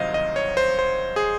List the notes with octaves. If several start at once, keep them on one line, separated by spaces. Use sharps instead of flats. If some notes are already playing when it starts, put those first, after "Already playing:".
Already playing: C2 D#3 F#3 C5 D#5 F5
D#5
C#5
C5
C5
G#4